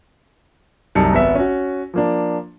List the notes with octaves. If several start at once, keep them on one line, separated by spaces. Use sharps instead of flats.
C2 F#2 D#4 A5 C#7
G#1 B3 E5
C#4 F#4
F3 A#3 D4